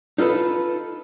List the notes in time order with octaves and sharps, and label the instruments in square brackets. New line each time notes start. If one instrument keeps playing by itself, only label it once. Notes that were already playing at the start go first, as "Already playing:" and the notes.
[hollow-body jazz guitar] D#4 F4 A4 B4